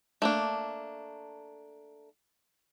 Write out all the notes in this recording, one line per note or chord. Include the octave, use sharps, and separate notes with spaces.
A3 A#3 D4